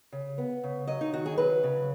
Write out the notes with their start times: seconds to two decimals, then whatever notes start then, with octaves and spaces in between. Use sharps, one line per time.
0.12 C#3
0.38 B3
0.64 C#3
0.87 F#3 D#5
1.01 D#4
1.13 D#3 F#4
1.26 G#4
1.38 F#3 B4
1.64 C#3